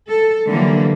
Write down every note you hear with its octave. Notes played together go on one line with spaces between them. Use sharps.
A4
D3 E3 F#3 G3 A#3